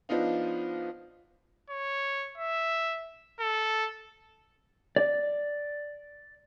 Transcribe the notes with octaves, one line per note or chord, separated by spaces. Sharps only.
F3 B3 D4 D#4 F4
C#5
E5
A4
D5